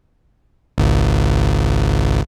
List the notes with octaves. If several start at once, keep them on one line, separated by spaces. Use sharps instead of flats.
G#1 C#2